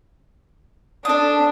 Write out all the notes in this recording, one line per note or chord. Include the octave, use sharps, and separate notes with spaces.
D4 A4 D#6